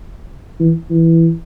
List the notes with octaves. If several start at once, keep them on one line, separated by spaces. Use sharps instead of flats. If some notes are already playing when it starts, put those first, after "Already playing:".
E3
E3